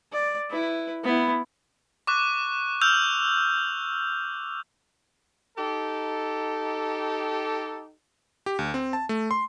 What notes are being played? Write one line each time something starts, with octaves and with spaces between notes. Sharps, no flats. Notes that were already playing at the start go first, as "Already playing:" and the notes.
D5
E4 B4
B3 E4
C#6 D6 F#6
E6 F6 G6 F7
D#4 G4 A4
G4
D2
C4
A5
A3
C6